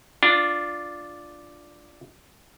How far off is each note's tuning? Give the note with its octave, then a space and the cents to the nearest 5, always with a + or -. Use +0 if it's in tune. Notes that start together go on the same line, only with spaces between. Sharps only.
D4 +0 F4 +0